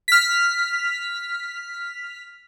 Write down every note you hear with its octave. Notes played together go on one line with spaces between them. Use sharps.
F6 B6